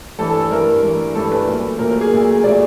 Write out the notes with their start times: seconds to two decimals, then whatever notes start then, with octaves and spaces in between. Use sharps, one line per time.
0.18 G2 E3 A3 A4
0.30 A4
0.40 A4
0.50 G2 E3 A3 A#4
0.83 G2 E3 A3
1.15 G2 E3 A3 A4
1.32 B4
1.47 A#2 F#3 A3
1.79 A#2 F#3 A3 A#4
1.91 A#4
2.01 G#4
2.12 A#2 F#3 A3
2.44 A#2 F#3 A3 D5